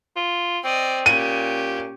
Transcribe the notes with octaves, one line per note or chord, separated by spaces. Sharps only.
F4
C4 D5 D#5
A#2 C#4 G4 D#7